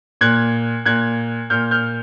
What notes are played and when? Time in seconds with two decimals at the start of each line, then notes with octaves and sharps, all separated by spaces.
0.21 A#2 F#6 G#6
0.86 A#2 F#6 G#6
1.50 A#2 F6 G6
1.71 F6 G6